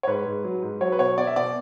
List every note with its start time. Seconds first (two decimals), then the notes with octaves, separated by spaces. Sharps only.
0.03 C#5
0.07 G#2 B4
0.26 G#2
0.45 F#3
0.62 G#2
0.81 F#3 C#5
0.92 B4
0.99 B2 C#5
1.18 B3 D5
1.27 E5
1.36 B2 D5